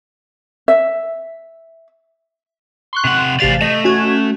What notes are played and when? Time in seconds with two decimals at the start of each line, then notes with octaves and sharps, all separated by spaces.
0.68 E5
2.93 C6 C#6 F#6
3.05 C3 F#5
3.40 A1 C3 D5 F5 A6
3.61 A3 D#5
3.84 C#4 F#4 G#6